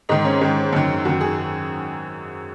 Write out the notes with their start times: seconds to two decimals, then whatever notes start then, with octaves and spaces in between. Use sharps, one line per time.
0.09 G#2 D#3 D#4
0.25 C#4
0.41 G#2 D#3 C#4
0.73 F#2 D#3
1.05 F#2 D#3 F#4
1.21 G#4